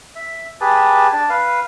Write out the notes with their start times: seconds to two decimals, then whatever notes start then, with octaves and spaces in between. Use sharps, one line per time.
0.15 E5
0.61 G4 G#4 B4 A5
1.13 D4 A5
1.30 B4 F5